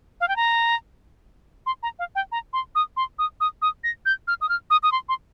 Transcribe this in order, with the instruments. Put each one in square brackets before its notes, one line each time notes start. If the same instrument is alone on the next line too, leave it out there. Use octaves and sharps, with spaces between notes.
[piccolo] F5
G5
A#5
C6
A#5
F5
G5
A#5
C6
D#6
C6
D#6
D#6
D#6
A#6
G6
F6
D#6
F6
D#6
D#6
C6
C6